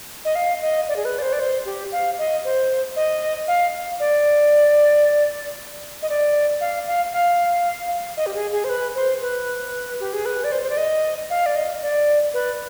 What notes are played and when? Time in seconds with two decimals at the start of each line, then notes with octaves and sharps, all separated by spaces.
0.25 D#5
0.35 F5
0.62 D#5
0.88 D5
0.96 G#4
1.05 B4
1.18 D5
1.22 C5
1.33 D5
1.40 C5
1.65 G4
1.92 F5
2.18 D#5
2.45 C5
2.96 D#5
3.48 F5
4.00 D5
6.02 D#5
6.09 D5
6.61 F5
6.87 F5
7.13 F5
8.17 D#5
8.26 G4
8.35 G#4
8.52 G#4
8.64 C5
8.69 B4
8.95 C5
9.21 B4
10.00 G4
10.13 G#4
10.25 B4
10.44 D5
10.52 C5
10.62 C5
10.70 D5
10.77 D#5
11.30 F5
11.46 D5
11.55 D#5
11.82 D5
12.34 B4